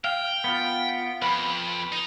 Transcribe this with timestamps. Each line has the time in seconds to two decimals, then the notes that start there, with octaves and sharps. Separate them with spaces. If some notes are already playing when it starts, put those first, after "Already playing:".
0.04 F5 G5
0.44 B3 F4
1.22 F2 B4 B5
1.92 D#4